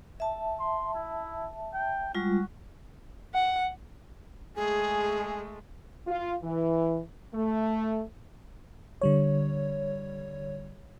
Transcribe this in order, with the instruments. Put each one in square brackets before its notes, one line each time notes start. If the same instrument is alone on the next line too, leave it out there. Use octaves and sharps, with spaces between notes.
[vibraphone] E5 A5
[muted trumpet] C6
E4
G5
[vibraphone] G3 G#3 F4 [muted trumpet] F#4
[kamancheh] F#5
[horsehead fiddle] G#3 A3 [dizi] G#4 [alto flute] G#5
[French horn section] F4
E3
A3
[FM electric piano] D3 G3 C#5